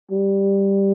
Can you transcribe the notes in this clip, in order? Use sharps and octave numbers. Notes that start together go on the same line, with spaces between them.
G3